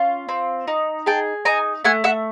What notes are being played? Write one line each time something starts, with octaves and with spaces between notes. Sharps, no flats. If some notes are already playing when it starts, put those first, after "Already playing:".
Already playing: C#4 F4
C4
D#4
G#4 G5 A5
D#4 G#5 A#5
A3 F#5 G#5
E5 F#5